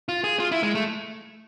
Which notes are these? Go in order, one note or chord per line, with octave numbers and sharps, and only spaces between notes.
F4
G#4
F4
E4
G#3
A3